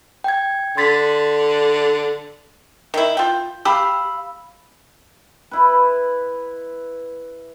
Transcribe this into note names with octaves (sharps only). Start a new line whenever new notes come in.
G5 G#6
D3 C6 A6 B6
D#3 E4
F4 G5
G4 F5 B5 E6
E4 B4